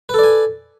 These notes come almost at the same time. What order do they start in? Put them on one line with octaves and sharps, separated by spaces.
B4 A4 D5 G#5